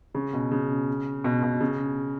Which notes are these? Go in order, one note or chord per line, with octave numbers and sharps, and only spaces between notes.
C#3
B2
C#3
B2
B2
C#3